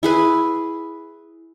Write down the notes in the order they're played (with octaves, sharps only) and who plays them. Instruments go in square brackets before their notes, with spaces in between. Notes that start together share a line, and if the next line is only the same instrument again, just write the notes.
[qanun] E4 G#4 B4